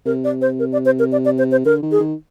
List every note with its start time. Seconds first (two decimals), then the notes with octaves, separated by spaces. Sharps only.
0.06 C3 A#4
0.24 D5
0.41 C5
0.59 A#4
0.73 D5
0.86 C5
0.99 A#4
1.12 D5
1.25 D5
1.38 C5
1.51 C5
1.65 D3 A#4
1.83 D#3
1.91 G#4
2.00 D#3